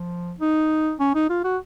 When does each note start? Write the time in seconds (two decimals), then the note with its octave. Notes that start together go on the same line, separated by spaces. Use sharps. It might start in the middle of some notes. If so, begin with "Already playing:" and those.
Already playing: F3
0.40 D#4
1.00 C#4
1.15 D#4
1.29 F4
1.44 F#4